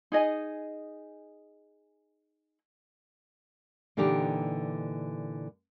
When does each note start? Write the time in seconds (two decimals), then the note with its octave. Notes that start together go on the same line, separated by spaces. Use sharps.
0.12 D#4 G#4 D#5 G#5
3.97 A#2 D3 E3 D4 D#4 G4